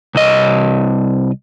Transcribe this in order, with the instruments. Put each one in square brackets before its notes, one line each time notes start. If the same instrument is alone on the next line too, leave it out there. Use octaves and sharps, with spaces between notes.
[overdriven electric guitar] C2 D#5